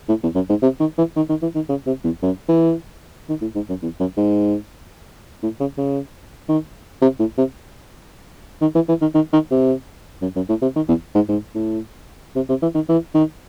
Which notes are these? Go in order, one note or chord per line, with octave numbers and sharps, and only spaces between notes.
A2
E2
F#2
G#2
C3
D#3
E3
D#3
D#3
E3
D#3
C#3
C3
E2
F#2
E3
D#3
A2
G#2
F#2
E2
F#2
G#2
A2
C#3
C#3
D#3
C3
A2
C3
D#3
E3
E3
D#3
D#3
D#3
C3
F#2
F#2
A2
C3
D#3
E2
G#2
G#2
A2
C3
C3
E3
D#3
E3
D#3